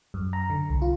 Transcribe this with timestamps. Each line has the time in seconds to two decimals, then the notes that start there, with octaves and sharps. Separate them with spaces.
0.14 F#2
0.33 A#5
0.50 D3
0.70 C2
0.82 F4